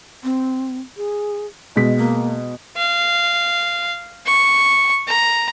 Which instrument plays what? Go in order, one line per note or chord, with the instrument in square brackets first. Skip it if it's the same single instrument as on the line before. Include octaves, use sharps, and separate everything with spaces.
[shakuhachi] C4
G#4
[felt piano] B2 G#3 B6 [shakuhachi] D#5
[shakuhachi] A#3
[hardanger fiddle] F5
C#6
A#5